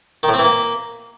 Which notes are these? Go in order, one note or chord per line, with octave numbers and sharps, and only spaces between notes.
D#3
A2
C4
E3
A#3